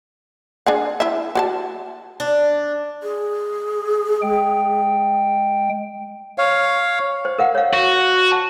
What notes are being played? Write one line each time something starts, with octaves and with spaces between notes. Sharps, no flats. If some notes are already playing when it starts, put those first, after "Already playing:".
D4 G#4 F#5
E4 E5
F#4 D5 A5
D4
G#4
G#3 G5
C#5 F5
C5
A#4 F5 F#5
C#5 F5
F#4
A5